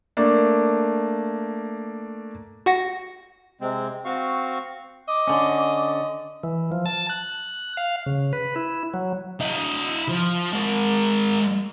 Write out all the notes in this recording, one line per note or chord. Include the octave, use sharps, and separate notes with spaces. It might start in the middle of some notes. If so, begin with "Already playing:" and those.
A3 A#3 D4
F#4 F#5 A#6
C3 G#3 C4
C4 F#4 F5 C#6
D#5 D6
D3 C#4
E3
F3
A5
F#6
F5
C#3
B4
E4
F#3
E4 D#5
F3
G#3 A#4